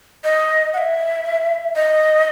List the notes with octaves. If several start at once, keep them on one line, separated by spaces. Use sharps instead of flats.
D#5
F#5
E5
D#5